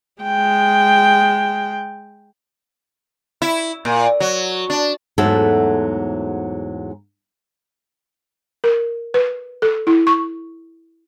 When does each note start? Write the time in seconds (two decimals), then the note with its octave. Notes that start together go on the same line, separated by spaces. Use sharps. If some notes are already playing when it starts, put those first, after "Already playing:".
0.22 G#3 G5
3.42 E4
3.85 A#2
4.20 F#3
4.70 D4
5.18 E2 G#2 F#3 A3 F#4 A4
8.64 A#4
9.14 B4
9.62 A4
9.87 E4
10.07 C#6